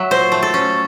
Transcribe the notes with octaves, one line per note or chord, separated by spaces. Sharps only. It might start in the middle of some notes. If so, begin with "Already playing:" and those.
Already playing: F#3 E5
A#2 C5
A3
A4
C#4